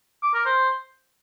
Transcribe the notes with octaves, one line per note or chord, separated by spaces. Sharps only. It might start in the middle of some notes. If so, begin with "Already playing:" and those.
D6
A#4
C5